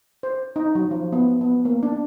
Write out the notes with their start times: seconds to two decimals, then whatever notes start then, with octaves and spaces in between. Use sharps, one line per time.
0.23 C5
0.56 D#4
0.75 F#3
0.91 F3
1.13 B3
1.41 B3
1.65 A#3
1.83 D4